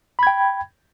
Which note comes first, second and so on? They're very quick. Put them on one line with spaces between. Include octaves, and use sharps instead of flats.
B5 G#6 G5